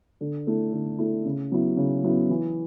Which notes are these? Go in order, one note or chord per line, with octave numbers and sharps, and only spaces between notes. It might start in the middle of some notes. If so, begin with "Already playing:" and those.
D3
A3 E4
D3
A3 E4
C#3
F#3 B3 E4
C#3
F#3 B3 E4
E3